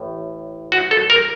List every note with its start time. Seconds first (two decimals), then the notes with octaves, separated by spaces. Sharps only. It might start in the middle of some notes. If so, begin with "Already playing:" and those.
Already playing: A1 A2
0.72 F#4
0.91 A4
1.10 A#4